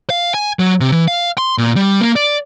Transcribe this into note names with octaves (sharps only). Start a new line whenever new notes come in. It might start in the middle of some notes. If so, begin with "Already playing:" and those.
F5
G#5
F#3
C3
E3
F5
C6
A#2
G3
A#3
D5